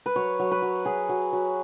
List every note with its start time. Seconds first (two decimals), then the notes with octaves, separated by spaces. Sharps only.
0.06 B4
0.16 F#3 C#5
0.39 F#3
0.51 B4
0.62 F#3
0.85 F#3 G#4
1.09 F#3
1.33 F#3